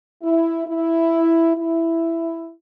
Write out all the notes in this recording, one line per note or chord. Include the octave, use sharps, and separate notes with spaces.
E4
E4
E4